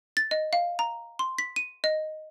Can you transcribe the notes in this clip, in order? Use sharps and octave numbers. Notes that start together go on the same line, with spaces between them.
A6
D#5
F5
A#5
C6
B6
D#7
D#5